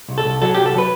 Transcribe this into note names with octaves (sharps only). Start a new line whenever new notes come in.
C2
A4
C2
F#3 A4
C2 G4
A4
F#3 B4